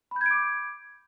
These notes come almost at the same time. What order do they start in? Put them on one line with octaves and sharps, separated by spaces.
B5 G6 G#6 D7 D6